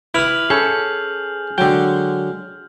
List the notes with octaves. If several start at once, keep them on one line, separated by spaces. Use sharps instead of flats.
E4 G4 B4 F6 F7 F#7
C#4 G#4 A4 G6
D3 F#3 G#3 G5